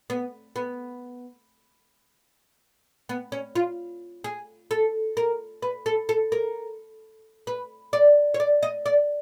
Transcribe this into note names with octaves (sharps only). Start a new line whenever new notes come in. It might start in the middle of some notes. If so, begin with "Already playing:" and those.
B3
B3
B3
C#4
F4
G#4
A4
A#4
B4
A4
A4
A#4
B4
D5
C#5
D5
D#5
D5